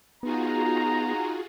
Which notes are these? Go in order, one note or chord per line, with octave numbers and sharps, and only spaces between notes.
B3 D#4 F4 F#4 G#4 A#5